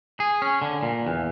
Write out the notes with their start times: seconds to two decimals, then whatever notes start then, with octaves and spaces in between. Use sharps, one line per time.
0.20 G#4
0.42 C#4
0.62 D3
0.83 A#2
1.07 E2